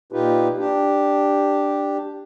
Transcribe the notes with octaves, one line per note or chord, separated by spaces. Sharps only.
A#2 D#4 F4 G4 B4
D4 G4